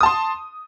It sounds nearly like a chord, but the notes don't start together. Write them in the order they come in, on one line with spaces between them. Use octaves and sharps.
D#6 A5 C6